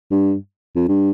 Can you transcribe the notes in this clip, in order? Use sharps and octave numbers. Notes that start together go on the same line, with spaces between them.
G2
F2
G2